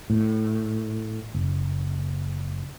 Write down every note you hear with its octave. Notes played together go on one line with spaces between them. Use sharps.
A2
F#1